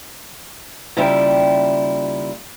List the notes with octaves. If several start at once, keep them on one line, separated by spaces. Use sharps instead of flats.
D#2 C#3 G3 E4 F4 G5